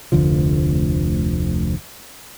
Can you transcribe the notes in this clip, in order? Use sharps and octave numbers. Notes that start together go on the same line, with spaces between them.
F1 D2 D3 F3